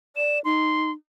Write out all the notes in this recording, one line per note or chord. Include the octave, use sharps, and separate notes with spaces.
D5 E7
D#4 C6